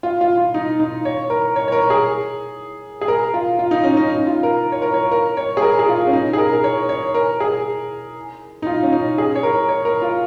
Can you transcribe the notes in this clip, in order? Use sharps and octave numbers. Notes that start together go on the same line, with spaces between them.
F4
F4
F4
D#4
D#4
C#5
A#4
C#5
C#5
A#4
G#4
G#4
A#4
F4
F4
D#4
C#4
D#4
D#4
F4
A#4
C#5
A#4
C#5
A#4
C#5
G#4
A#4
G#4
F4
C#4
D#4
G#4
A#4
A#4
C#5
C#5
A#4
G#4
D#4
F4
C#4
D#4
G#4
C#5
A#4
C#5
A#4
F4